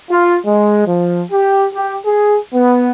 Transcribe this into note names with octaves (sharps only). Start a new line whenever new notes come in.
F4
G#3
F3
G4
G4
G#4
B3